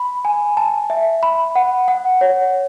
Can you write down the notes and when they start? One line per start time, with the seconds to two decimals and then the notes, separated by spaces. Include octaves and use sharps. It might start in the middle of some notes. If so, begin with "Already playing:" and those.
Already playing: B5
0.25 G#5
0.57 A5
0.90 E5
1.23 B5
1.55 F#5
1.88 F#5
2.21 C#5